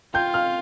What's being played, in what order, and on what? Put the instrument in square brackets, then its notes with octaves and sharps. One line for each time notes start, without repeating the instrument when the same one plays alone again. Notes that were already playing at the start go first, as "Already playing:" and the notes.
[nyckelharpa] F4 [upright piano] G5 G6
[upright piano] F5 F6